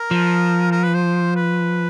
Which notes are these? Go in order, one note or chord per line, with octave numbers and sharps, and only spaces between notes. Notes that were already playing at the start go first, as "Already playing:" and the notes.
Already playing: A#4
F3
A#4
B4
C5
B4